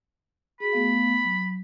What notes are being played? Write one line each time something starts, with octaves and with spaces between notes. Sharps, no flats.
F#4 G#4 B5
A3 B3 F5
F#3